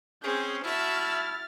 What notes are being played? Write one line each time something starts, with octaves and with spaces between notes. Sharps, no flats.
C4 C#4 G#4 G6
E4 F#4 E5 A5 F6 A6